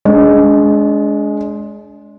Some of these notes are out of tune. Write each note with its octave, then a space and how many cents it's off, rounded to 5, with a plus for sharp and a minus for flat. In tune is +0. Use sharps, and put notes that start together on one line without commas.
G#3 +15 D4 -35 D#5 +0